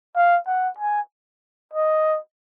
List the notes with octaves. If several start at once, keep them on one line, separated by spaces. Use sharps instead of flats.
F5
F#5
G#5
D#5